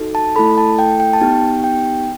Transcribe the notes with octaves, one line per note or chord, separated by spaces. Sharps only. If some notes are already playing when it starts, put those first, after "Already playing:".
Already playing: D#4 F#4 A4
A5
A3 E4 A4 B5
A5
G5
G5
A5
B3 D#4 G4 G5
G5